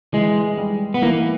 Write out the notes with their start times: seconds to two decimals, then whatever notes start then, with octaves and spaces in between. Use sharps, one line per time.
0.13 E3 G#3
0.57 G3
0.94 B3
1.02 E3 A#3